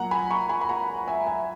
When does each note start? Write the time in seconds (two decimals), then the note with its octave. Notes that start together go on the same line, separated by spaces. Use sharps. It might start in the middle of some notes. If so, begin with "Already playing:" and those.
Already playing: A#2 F#3 A#3 F#5 A#5
0.11 G#5 B5
0.31 A#5 C#6
0.49 G#5 B5
0.61 B5
0.69 F#5 A#5
1.08 E5 G#5
1.27 E5 G#5